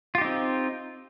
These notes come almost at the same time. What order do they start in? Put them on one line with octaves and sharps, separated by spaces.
F4 G4 D#4 C4